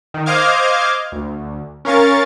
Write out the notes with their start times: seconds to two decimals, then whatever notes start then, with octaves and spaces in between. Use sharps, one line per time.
0.14 D#3
0.26 C5 D#5 F5 D6 F6 G#6
1.12 D2
1.85 C#4 A#4 F5 C#6 A6